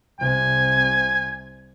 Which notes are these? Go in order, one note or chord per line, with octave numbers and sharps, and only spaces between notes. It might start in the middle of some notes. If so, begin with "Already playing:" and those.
C2 C3 G#5